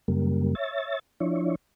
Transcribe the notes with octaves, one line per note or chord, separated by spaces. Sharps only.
F#2 C#3 G3 A#3
C#5 E5 A6
F3 D4 E4 C#5